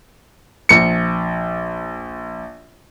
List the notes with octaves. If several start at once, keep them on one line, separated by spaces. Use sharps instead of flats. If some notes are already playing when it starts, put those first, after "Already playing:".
A#1 C#7